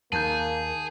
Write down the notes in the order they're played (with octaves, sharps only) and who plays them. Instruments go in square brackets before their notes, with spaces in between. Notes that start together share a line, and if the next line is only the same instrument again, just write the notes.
[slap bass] D#2 [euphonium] A#3 [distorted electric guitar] G#4 [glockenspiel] A5 G6